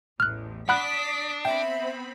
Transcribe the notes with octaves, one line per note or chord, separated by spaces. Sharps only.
A1 E2 F6 F#6
D4 D5 F#5 B5 D#6 F#6 B6
B3 C4 E5 G5 B5